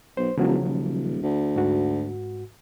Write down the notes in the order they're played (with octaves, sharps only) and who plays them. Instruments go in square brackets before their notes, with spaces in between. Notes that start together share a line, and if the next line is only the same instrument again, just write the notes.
[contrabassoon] B1 [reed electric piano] C5
[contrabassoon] E1 [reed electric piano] C#3 F3 F#3
[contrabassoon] D#1
D2
[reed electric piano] G#2 F#4